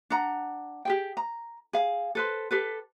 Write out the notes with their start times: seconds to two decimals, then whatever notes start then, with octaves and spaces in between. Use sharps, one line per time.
0.10 D4 F#5 A#5
0.85 G4 G#4 G5
1.17 A#5
1.73 G#4 F5
2.15 A4 B4 C5
2.51 G4 A4 B4